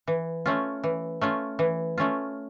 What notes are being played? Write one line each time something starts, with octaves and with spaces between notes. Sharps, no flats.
E3
A3 C#4 F4
E3
A3 C#4 F4
E3
A3 C#4 F4